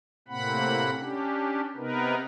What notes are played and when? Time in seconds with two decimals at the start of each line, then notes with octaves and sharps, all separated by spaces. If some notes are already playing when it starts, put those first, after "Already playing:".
0.28 A2 C3 A#3 C4 F#5 B5
0.99 C#4 D4 G4
1.76 C3 B3 D#4 A#4 B4